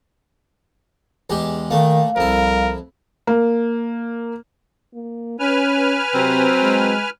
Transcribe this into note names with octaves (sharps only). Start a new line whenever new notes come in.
E2 G#3 G4
A#2 D#3 A3 F5
C2 F2 E4 A#4
A#3
A#3
C#4 B4 G#5 F6
C3 F#3 C4
G#3